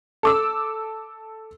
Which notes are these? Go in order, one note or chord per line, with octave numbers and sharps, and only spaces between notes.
A4 D6 E6